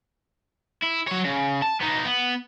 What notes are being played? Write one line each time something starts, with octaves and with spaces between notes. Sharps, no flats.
E4
F#3 C#5
C#3
A5
B3 D#4
B3